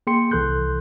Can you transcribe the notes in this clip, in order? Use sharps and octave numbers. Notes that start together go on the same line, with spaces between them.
A#3 G#4 G5 C6 C#7
C2 E3 A4 C6 F#6 G6